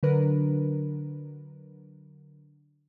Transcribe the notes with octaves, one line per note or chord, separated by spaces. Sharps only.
D3 F#3 D4 A#4 B4